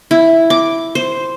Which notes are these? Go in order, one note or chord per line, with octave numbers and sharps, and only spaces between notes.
E4
D6
C5